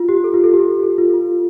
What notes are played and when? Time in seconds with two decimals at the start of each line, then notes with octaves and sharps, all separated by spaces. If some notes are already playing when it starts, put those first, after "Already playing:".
Already playing: F4
0.09 G4
0.24 A4
0.34 F4
0.44 A4
0.54 G4
0.83 A4
0.98 F4
1.14 F4